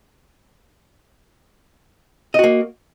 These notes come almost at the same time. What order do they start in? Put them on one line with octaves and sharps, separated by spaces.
D#5 F#4 A#3